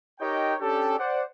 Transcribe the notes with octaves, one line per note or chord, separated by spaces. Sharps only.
D#4 G4 A#4 C#5 D#5 G5
C#4 D4 G4 A4
C5 D5 F#5